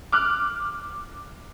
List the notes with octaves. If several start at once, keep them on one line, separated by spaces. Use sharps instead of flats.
D6 F6 F#6